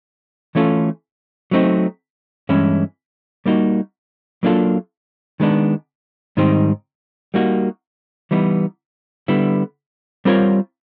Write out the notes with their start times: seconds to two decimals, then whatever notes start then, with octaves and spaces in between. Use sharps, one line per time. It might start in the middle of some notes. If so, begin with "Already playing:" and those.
0.55 E3 A3 C#4 F4 A4
1.51 F#3 A3 C4 D#4
2.49 G2 E3 G#3 C#4 E4
3.46 G3 A#3 D#4 F#4
4.43 F#3 A#3 D4 F4 A4
5.40 D#3 G#3 B3 D4
6.37 G#2 D#3 G3 C4 D#4
7.34 G3 A#3 D#4 F#4
8.31 E3 G3 B3 D#4
9.28 D3 G3 B3 E4
10.25 G3 C4 F4 A#4 C#5